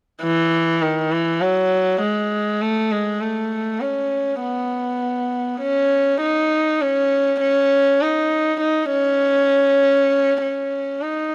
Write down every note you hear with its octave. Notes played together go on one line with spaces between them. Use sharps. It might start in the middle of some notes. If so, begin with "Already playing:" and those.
E3
D#3
E3
F#3
G#3
A3
G#3
A3
C#4
B3
C#4
D#4
C#4
C#4
D#4
D#4
C#4
C#4
D#4